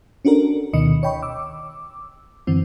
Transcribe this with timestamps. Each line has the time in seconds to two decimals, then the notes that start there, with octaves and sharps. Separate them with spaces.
0.25 C#4 D4 F#4 A4 A#4
0.73 D2 B2 D#3 D#5 C#7
1.03 C#5 D#5 G5 B5 C#6
1.23 D6 E6
2.47 F#2 D3 E3 C4